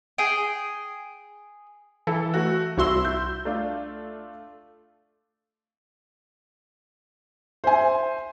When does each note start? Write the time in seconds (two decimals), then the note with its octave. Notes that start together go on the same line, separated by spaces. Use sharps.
0.18 G#4 G5
2.07 E3 A4
2.34 A3 F#4
2.78 C2 E4 F#4 C6 E6
3.05 G6
3.45 A3 D4 F4
7.64 C5 E5 G#5